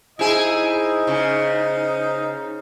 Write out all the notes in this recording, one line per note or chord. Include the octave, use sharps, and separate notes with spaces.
D#4 E4 G#4 C5 D#5
C#3